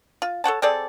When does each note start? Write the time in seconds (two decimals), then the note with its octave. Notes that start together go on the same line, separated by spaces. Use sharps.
0.22 F4
0.44 A4 C#5 F#5 A5
0.62 C4 G#4 A4 D5